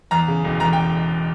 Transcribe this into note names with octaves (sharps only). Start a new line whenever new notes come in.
E2 A#5
C#3
E1
E2 A#5
G5